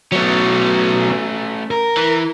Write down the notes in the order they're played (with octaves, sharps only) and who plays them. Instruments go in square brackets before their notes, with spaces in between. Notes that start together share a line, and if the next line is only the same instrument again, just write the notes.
[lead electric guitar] F#3 B3 [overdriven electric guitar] A3 C#4
[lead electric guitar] A#4
[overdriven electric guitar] E3